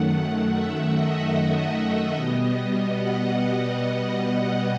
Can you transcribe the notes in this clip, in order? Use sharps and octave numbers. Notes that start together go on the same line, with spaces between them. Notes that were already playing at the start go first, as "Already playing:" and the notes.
Already playing: F#2 D#3 A3 F#5
E5
D#5
D#5
B2 G3 B3
F#5